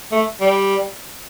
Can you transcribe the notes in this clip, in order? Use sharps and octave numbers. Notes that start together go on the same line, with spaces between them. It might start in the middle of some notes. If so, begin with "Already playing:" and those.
A3
G3